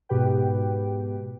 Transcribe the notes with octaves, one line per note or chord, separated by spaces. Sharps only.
G#2 B2 G4 B4 G5